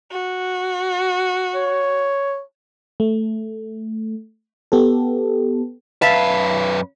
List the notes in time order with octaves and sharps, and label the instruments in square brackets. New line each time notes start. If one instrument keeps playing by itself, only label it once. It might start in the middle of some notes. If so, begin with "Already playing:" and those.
[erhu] F#4
[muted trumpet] C#5
[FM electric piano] A3
B3 G4 A4
[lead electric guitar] F#2 B4 [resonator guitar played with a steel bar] E5 F5 A5